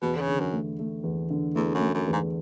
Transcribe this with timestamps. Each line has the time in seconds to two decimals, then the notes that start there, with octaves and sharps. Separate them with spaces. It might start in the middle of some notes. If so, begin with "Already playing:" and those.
0.02 E2 B2
0.16 D3
0.21 C#3
0.27 D3
0.40 F#2
0.53 A3
0.79 A3
1.03 E2
1.30 D3
1.55 E2 A3
1.75 F#2
1.80 A3
1.94 F#2
2.07 E2
2.13 G#2